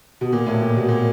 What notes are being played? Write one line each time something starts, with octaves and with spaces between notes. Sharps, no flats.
B2
A#2
A2
A#2
B2
A#2